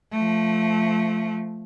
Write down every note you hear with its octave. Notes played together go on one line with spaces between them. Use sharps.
F3 A3